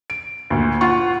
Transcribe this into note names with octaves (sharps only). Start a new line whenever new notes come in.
D7
D2 A#2
F4 F#5 C#6